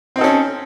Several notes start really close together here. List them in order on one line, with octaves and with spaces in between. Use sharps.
C4 D#4 A4 C#4